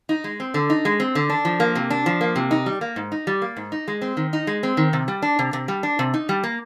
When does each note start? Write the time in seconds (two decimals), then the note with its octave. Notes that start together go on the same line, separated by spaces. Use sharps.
0.09 D#4
0.24 G#3
0.40 C4
0.54 D3
0.70 D#4
0.85 G#3
1.00 C4
1.15 D3
1.30 D4
1.45 F3
1.60 A#3
1.75 C3
1.90 D4
2.06 F3
2.21 A#3
2.36 C3
2.51 D#4
2.66 G3
2.81 A#3
2.96 G#2
3.12 D#4
3.27 G3
3.42 A#3
3.57 G#2
3.72 D#4
3.88 G#3
4.02 C4
4.17 D#3
4.33 D#4
4.47 G#3
4.63 C4
4.77 D#3
4.93 C3
5.08 G3
5.22 D4
5.39 C3
5.53 C3
5.68 G3
5.83 D4
5.99 C3
6.14 D#4
6.29 G3
6.44 A#3